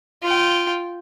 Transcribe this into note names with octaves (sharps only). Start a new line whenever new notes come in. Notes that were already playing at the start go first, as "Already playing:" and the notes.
F4 G5